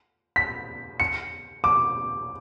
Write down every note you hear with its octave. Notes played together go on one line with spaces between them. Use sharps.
B6
C#7
D6